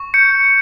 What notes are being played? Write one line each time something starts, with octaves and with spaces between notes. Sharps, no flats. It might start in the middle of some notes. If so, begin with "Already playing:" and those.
Already playing: C#6
G6 C#7